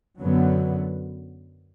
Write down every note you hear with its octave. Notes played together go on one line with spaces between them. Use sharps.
F#2 D3 F#3 B3